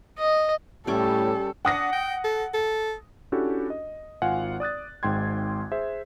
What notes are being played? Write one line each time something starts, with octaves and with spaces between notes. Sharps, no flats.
D#5
A2 G3 C#4 G4 A4 D6
D4 F#5 D#6 A#6
G5
A4
A4
C#4 D4 E4 F#4 G4 A4
D#5
G#1 F4 F5 F#5 G#5
D5 D#6 F#6 A6
G#1 G#2 G5 C6 G#6
G#4 C5 E5